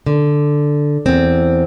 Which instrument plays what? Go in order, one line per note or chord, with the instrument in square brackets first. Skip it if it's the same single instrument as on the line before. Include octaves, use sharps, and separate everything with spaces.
[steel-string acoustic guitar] D3
E2 C4